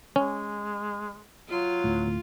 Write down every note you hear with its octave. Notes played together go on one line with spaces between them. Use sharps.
G#3 C#4
F#3 F4
D1 A2